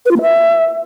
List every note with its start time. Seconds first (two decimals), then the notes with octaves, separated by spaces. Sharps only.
0.06 B4
0.11 F4
0.16 A#3
0.22 E5